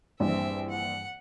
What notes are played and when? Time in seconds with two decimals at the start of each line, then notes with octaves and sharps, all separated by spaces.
0.20 A#1 G2 E3 C4 E5
0.69 F#5